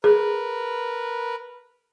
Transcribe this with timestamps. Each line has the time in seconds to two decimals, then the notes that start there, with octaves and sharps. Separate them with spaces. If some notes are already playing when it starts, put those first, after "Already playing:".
0.04 G#4 A#4 B4